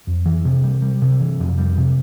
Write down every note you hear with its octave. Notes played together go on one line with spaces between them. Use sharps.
F2
E3
C3
G3
G3
C3
E3
F2
G3
C3